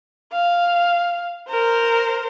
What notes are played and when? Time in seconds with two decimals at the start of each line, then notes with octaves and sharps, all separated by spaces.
0.32 F5
1.48 A#4 C5